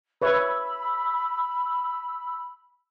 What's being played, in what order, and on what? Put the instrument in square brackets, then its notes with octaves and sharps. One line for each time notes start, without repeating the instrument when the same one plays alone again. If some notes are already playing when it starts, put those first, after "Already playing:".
[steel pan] B4 C#5 E5 [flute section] B5 E6